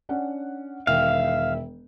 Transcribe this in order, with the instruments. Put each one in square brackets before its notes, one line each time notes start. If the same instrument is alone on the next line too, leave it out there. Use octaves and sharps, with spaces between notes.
[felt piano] C#4 D4 F#5
[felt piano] E1 D#3 G5 [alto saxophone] E5 [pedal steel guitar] F5